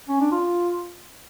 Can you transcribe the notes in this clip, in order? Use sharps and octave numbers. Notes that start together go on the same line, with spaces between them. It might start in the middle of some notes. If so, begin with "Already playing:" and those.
C#4
D4
F4